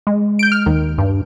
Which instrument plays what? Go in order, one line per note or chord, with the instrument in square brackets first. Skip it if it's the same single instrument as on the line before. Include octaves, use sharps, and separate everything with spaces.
[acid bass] G#3
[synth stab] G6 D7
F6
D#2 D#3
[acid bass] G2